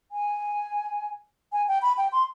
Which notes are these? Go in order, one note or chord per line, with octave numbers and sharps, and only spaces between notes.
G#5
G#5
G5
B5
G5
C6